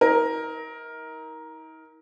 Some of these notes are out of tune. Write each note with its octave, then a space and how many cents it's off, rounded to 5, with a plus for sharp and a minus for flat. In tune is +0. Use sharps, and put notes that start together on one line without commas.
D#4 +45 A#4 +10